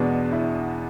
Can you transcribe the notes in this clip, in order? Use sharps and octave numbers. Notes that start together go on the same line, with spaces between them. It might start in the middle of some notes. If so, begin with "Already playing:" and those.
Already playing: E2 B2 G#3 B3 D4
E4